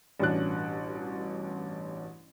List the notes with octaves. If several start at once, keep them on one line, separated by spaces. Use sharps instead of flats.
A1 G2 B2 C#4 D4 F#6